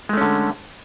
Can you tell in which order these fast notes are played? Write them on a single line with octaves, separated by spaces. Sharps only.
G#3 A3 C#4 D3